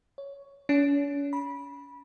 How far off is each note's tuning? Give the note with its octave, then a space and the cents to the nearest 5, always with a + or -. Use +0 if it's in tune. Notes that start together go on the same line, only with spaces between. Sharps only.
C#5 +10
C#4 +40
B5 -20